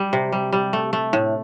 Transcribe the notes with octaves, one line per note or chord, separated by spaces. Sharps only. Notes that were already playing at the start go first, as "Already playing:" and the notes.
Already playing: G3
C3
G3
G3
A3
A3
A2